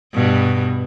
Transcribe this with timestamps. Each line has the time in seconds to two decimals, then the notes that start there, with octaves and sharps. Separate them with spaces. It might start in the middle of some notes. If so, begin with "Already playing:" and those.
0.14 G2 B2